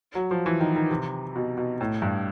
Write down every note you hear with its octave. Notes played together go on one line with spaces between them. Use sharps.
F#3
F3
E3
D#3
D#3
C3
B2
B2
A2
G2